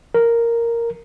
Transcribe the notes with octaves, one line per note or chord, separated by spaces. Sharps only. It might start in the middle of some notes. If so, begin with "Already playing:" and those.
A#4